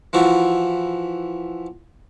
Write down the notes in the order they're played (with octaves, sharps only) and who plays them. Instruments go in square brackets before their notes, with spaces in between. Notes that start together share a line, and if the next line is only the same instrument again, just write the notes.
[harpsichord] E3 F3 E4 F#4